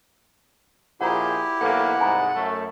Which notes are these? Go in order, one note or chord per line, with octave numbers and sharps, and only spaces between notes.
A#1 E4 F4 G4 G#4 C5 F#5 A#5
B1 E3 A#3 A4 B4 F5 F#5
C2 G#2 G#5 A#5 B5
F#2 A3